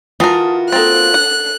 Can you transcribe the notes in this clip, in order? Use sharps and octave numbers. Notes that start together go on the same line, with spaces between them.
E3 F4 F#4 A#4 A5 D#6
A#3 C4 A4 F#6 A6
F#5